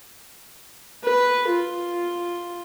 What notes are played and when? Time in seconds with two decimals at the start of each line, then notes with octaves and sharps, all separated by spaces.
1.04 B4
1.48 F4